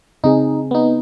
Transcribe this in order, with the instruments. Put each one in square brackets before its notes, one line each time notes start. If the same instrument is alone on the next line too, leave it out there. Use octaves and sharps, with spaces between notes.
[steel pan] C#3 C4 G#4 [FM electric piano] D#4
[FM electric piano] B3 D#4